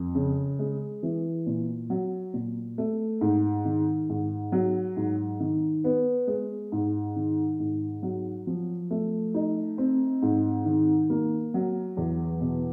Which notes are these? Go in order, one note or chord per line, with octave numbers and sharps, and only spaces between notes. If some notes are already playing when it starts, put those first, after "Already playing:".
Already playing: F2
C#3
G#3
E3
A#2
F#3
A#2
A3
G#2
D#3
G#2
F#3
G#2
D#3
B3
G#3
G#2
D#3
G#2
F#3
F3
A3
D#4
C4
G#2
D#3
A#3
F#3
E2
B2